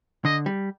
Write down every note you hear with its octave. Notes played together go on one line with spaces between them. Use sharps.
D3 D#5
G3